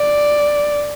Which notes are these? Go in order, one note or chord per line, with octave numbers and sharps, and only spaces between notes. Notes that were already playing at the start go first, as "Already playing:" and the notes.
Already playing: D5